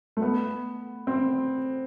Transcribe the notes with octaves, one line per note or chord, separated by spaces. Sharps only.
A3
B3
C4